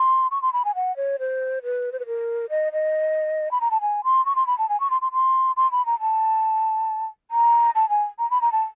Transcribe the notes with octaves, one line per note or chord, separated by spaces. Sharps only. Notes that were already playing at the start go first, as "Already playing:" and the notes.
Already playing: C6
C#6
C6
B5
G#5
F#5
C#5
C5
B4
C5
B4
A#4
D#5
D#5
B5
A#5
A5
G#5
C6
C#6
C6
B5
A5
G#5
C#6
C6
C6
C6
C6
B5
A#5
A5
A#5
A5
G#5
A#5
B5
A#5
A5